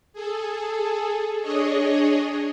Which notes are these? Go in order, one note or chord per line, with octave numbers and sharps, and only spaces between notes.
G#4 A4
D4 G#4 C#5 D#5